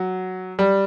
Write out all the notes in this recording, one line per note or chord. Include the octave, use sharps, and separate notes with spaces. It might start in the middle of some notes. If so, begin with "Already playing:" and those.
Already playing: F#3
G3